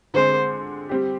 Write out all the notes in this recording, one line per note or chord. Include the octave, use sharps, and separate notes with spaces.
D3 G#3 C4 C5
G3 C4 G4